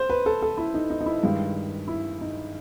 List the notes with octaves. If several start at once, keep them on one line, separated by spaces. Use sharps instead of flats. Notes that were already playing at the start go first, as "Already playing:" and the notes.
Already playing: C5
B4
A4
A4
E4
D#4
D#4
D#4
E4
G2 D#3 G#3
E4
D#4